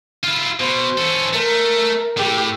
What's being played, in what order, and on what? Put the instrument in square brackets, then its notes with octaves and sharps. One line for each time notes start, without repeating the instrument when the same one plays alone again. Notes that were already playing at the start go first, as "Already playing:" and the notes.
[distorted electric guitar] E4 F4
[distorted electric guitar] B2 [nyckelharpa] C5
[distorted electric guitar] C#4 A4
[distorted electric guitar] A3 [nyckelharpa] A#4
[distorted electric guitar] A2 [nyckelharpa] G4